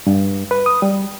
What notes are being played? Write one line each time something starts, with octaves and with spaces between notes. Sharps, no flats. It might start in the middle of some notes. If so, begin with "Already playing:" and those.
G2
B4
D#6
G3